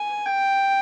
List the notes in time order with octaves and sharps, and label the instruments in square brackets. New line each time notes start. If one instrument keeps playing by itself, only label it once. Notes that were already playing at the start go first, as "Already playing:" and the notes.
Already playing: [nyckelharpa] G#5
G5